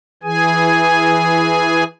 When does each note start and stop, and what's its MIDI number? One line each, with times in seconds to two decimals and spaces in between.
0.23 1.84 52
0.23 1.84 68
0.23 1.84 80